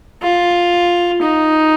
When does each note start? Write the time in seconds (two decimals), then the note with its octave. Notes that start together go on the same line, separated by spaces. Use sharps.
0.22 F4
1.22 D#4